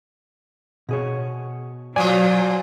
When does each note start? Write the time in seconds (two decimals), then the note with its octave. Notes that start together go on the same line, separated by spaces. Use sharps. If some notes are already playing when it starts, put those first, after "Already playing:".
0.89 B2 G#4 C#5
1.96 A#2 F3 F#3 F4 D5 G#5